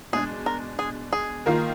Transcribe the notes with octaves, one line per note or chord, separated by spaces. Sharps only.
B2 G#3 D4 G#4
A#4
G#4
G#4
D#3 A#3 F4 A#4